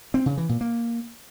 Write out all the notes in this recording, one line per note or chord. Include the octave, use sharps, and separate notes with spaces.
C4
C#3
E3
A#2
A#3